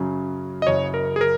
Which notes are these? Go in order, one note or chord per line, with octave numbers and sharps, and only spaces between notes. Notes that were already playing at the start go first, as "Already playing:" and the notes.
Already playing: F#2 C#3 F#3 C#4
D#5
F#1 F#2 C#3 C#5
A#4
G#4
A#4